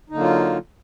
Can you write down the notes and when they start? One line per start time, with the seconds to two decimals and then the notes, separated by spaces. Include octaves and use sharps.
0.10 D#4
0.12 D3
0.15 A#3
0.18 F#3
0.20 F4